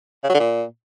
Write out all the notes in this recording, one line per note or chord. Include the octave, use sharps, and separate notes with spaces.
C#3
F#3
D3
A#2